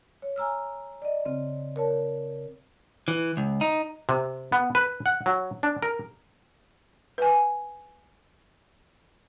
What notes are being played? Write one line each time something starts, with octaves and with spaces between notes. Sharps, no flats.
C#5
G#5 A#5 E6 F6
D5 D#5
C#3 C4
A#4 C#5 A5
E3
C#2
D#4
C3
B3
B4
F#5
F#3
D4
A#4
B4 G#5